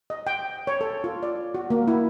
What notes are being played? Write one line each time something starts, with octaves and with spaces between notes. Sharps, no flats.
D#5
G5
C#5
A4
F4
D5
F#4
A#3
E4